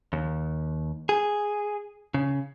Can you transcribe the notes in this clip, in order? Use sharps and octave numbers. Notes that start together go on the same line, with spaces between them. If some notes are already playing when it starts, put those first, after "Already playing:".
D#2
G#4
C#3